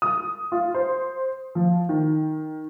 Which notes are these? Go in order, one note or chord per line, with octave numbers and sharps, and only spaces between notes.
D#6
F4
C5
F3
D#3